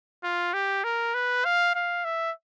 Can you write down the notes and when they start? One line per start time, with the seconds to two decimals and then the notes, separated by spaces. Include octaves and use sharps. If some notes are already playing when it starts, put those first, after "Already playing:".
0.24 F4
0.54 G4
0.84 A#4
1.14 B4
1.45 F5
1.75 F5
2.05 E5